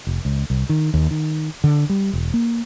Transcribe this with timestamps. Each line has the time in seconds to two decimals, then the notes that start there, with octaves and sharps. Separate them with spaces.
0.07 F1
0.25 C#2
0.50 C2
0.69 D#3
0.94 D#2
1.11 D#3
1.64 D3
1.89 G3
2.13 E1
2.34 A#3